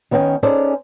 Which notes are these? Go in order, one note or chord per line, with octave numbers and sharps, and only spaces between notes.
D#3 B3 C#4 F5 G5
C#4 D#4 G#4 A4 C5 D5